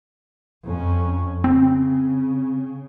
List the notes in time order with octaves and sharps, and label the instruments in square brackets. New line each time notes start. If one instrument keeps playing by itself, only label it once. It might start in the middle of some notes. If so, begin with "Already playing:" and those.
[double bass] F2 C#4
[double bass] C#3 [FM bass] C4